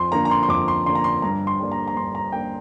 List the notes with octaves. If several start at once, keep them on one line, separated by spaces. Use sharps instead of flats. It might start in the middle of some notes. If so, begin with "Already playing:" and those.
Already playing: F2 C6
D3 A#3 A#5
A#5
C6
C6
F2 D6
C6
D3 A#3 C6
A#5
C6
G2 A#5
C6
G3 A#3 D4
A#5
A#5
G2 C6
A#5
G3 A#3 D4 G5